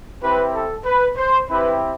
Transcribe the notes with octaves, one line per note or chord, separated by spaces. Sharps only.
C4 E4 G4 B4
A4
B4
C5
C4 E4 G4 B4